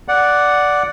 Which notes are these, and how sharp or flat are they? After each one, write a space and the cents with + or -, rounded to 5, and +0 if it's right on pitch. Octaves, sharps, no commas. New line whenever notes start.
D5 -5 F#5 +0